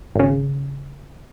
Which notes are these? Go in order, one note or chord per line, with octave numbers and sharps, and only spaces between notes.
G#1 C#3